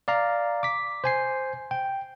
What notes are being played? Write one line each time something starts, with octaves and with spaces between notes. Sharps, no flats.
D5 F5 A#5
D6 B6
C5 G#5 C7
G5